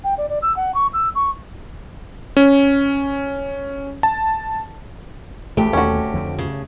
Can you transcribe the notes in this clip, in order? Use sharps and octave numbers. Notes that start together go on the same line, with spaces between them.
G5
D5
D5
E6
F#5
C#6
E6
C#6
C#4
A5
A1 D2 G#3 A3 G4
D#2 B2 C#4 F#4
F2 D3 F3
C#3